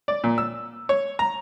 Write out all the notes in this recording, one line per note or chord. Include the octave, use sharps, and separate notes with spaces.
D5
A#2
E6
C#5
A#5